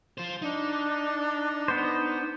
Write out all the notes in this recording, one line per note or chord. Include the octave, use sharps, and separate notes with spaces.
F4 C5
D4 D#4
B3 C5